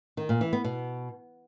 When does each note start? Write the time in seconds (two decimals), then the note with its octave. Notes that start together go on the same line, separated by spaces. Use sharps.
0.17 D#3
0.29 A#2
0.41 E3
0.53 B3
0.64 B2